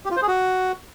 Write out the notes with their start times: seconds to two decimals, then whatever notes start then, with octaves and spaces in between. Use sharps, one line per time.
0.05 G4
0.11 F4
0.16 C5
0.22 G#4
0.28 F#4